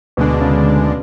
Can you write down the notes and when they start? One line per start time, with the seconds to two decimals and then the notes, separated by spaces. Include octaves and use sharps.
0.17 D2 B2 D3 G#3 D4
0.41 C#3